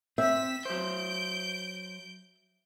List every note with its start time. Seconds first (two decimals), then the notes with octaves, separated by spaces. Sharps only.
0.18 C4 E5 B6 E7
0.65 F#3 C5 G6 D7